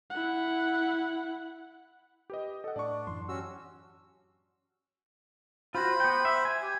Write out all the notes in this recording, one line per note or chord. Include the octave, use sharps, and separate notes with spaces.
E4 F#5
G4 B4 D#5
A4 D#5 F#5
A2 D4 D5 C#6
F#2 E3 C6
C#4 F#4 G4 E6
F4 F#4 C5 B5
B3 G5
E5
G#5
G4